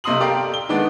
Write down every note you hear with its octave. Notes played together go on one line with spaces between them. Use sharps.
B1 C3 D#5 C6 D#6 F#7
G4 A4 A#4 D5 F5 G5
G7
D#3 G#3 B3 D4